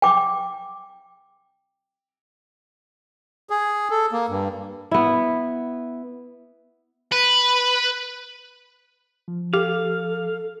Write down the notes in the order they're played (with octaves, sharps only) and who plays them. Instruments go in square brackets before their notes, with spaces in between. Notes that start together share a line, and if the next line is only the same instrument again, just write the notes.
[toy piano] G5 D6
[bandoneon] G#4
A4
A#3
G2
[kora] B3 E4
[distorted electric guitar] B4
[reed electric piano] F3
[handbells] G4 [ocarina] A4 [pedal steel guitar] F5